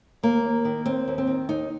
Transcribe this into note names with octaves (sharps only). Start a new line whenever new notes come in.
D#2 A#3
D#2
D#3
D#2 C4
D#2
C4
D#3
D#2 D#4